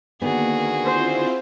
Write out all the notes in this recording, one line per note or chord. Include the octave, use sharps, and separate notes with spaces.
D3 D#3 A#3 B3 F#4 G#4
C4 E4 F4 C5